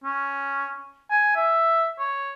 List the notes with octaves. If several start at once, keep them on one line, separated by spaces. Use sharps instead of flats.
C#4
G#5
E5
C#5